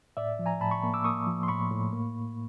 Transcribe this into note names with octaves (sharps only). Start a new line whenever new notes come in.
A2 D5 E5
F3
G#5 A#5
A2 A5 B5
B5 C#6
A#3
D6 E6
A#3 C#6 D#6
F3
C6
A2 B5 C#6
A2
A#3